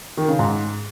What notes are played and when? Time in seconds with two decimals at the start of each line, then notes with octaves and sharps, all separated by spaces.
0.17 D#3
0.28 C#3
0.39 G#2